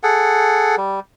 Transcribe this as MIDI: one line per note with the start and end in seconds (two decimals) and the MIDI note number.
0.03 0.76 68
0.03 0.76 69
0.03 0.76 78
0.78 1.00 55